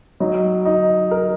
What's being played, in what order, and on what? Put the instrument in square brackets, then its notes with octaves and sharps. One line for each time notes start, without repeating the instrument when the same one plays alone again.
[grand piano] F#3 [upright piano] D#4
[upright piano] D#4
A#4